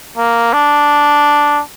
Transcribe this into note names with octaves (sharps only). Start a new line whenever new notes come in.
A#3
D4